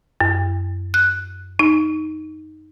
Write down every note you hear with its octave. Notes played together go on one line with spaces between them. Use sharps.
F#2
F#6
D#4